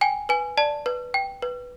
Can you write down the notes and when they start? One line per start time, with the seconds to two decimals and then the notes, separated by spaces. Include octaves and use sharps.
0.01 G5 G#5
0.29 B4 G#5
0.57 D5 A5
0.86 B4
1.14 G5
1.42 B4